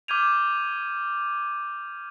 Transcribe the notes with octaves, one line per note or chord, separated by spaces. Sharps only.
D6 F6 G6 G#6 D#7 F7